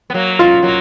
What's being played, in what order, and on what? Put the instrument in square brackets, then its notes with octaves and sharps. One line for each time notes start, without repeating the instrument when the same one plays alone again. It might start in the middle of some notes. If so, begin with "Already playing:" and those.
[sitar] B3
F#3 A#3
[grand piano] F4
[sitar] F#3 A#3